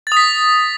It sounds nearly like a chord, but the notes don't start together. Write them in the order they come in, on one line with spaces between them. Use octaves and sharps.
A6 D#6 B6